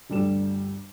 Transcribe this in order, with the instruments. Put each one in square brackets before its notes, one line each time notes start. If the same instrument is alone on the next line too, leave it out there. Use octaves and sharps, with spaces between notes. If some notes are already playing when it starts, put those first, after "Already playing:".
[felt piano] G1 D2 G3 G4 A4 E7